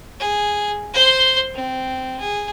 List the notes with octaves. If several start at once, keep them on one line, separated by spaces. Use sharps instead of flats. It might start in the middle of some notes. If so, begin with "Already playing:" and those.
G#4
C5 C6
C4
G#4